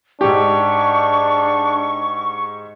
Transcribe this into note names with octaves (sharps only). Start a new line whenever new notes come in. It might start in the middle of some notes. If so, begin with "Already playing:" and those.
G#2 D4 G4 C#6